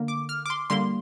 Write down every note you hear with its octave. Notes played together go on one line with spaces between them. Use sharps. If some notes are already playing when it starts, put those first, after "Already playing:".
Already playing: D3 A#3
D6
F6
D6
C6
D3 G3 A#3 C6